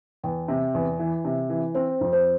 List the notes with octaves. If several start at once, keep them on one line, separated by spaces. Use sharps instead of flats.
E2 G5
C3
E2
E3
C3
E3
C4 C5
F2
C5